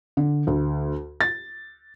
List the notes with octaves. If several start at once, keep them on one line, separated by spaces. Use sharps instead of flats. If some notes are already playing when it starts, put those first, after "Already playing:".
D3
D2
A6